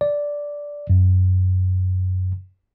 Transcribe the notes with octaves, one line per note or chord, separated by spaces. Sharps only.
D5
F#2